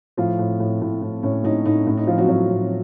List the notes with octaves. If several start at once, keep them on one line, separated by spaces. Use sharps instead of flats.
A2 F3 F4
A2
A2
A2
A2
A2 C#4
A2 D#4
A2 D#4
A2 C#4
D#4
A2 F3 F4
F#3 F#4
A2 F#3 F#4
A2